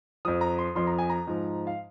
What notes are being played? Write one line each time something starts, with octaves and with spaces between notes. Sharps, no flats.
F2 F3 D#6
A#5
C6
F2 F3 C6
A#5
G#5
A#5
G#2 F3
F5